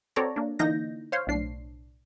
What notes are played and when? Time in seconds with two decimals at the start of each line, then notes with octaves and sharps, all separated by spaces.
0.16 C4 F#4 A4 C#5 D5 A#5
0.36 A#3 D4
0.59 D3 E3 A#3 D#4 G6 A#6
1.12 C5 C#5 F5 C6
1.27 B1 A2 D4 C7